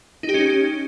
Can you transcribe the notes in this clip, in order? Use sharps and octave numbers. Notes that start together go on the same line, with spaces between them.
D#4
G4
C#4